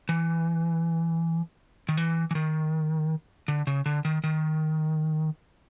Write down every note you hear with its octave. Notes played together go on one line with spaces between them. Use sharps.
E3
D#3
E3
E3
D#3
D3
C#3
D3
D#3
D#3